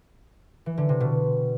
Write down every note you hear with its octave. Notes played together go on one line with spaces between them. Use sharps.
E3
D3
C3
B2